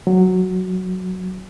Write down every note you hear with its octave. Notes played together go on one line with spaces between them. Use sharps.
F#3